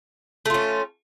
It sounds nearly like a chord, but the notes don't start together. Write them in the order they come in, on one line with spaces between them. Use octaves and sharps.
A3 F4 C#4